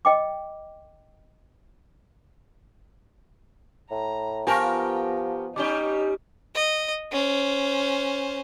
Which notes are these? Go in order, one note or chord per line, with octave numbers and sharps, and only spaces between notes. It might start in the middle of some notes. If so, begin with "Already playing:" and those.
D#5 G5 D6
A2 A#5
F3 B3 F4 G4 A#4 G#5 A5 C#6
G3 C#4 D#4 G4 D6 G7
D#5
C#4 C5